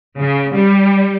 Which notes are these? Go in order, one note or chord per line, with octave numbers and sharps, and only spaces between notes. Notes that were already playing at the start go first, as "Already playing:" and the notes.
C#3
G3